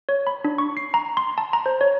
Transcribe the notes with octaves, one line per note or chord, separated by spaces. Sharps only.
C#5
B5
D4
C#6
C7
A#5
C6
A5
A#5
C5
C#5